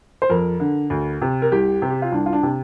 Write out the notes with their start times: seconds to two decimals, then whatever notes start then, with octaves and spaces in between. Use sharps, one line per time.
0.22 C5
0.30 F2 A#4
0.60 D3
0.90 D2
1.22 C3
1.42 A#4
1.52 C2 G4
1.82 C3
1.90 G4
2.02 F4
2.12 C2 D4
2.26 F4
2.33 D4
2.43 C3